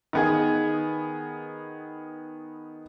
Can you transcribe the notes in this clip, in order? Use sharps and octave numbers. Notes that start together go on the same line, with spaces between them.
D#3 B3 G#4